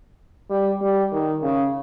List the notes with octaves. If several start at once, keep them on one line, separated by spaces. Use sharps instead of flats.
G3
G3
D#3
C#3